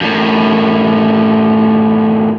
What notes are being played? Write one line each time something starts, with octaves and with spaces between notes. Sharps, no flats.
F#2 A2